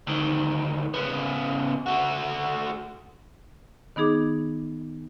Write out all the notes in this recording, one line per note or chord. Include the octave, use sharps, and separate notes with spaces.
D2 D#3
C#3 B3
A3 F#4
D#3 B3 D#4 G#4 D6